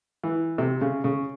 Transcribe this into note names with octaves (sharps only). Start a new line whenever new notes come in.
E3
C3
C#3
C#3